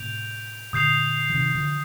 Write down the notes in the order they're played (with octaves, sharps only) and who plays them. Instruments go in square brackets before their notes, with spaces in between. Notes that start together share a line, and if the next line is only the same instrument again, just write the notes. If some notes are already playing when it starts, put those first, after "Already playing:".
Already playing: [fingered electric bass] A2 C3 [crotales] G6 D7 F7
[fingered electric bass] A#2 D3 [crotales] D#6 G6 C7 F7
[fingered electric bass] F3
C3 D#3
D3 F3